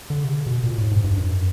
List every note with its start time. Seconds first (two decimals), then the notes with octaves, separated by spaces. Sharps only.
0.10 D3
0.24 C3
0.29 C#3
0.47 B2
0.64 A#2
0.78 A2
0.91 G#2
1.04 G2
1.18 F#2